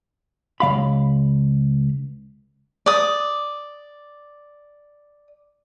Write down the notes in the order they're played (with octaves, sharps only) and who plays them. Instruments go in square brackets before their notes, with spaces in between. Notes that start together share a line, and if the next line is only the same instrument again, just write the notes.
[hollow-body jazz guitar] C#2 C#3 F5 B5
[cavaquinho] D5 D#6